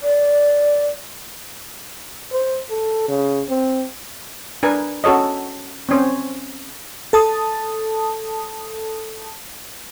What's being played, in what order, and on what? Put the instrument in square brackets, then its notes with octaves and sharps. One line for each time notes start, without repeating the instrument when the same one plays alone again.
[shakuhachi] D5
[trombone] C5
A4
C#3
C4
[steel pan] D4 A#4 B4 G#5
C#4 F#4 A4 C#5 D#5
C4 C#4 C5
[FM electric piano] A4 A5 D#6